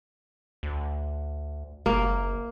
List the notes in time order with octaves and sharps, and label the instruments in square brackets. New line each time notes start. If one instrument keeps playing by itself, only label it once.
[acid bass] D2
[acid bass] F#1 [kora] A#3